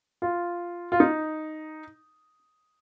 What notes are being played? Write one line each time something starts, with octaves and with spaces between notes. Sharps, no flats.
F4
F4
D#4